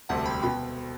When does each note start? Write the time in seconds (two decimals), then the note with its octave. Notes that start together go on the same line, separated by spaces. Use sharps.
0.09 E1 D2 C3 G3 F#5 A5
0.25 G5 B5
0.42 B2 G5 B5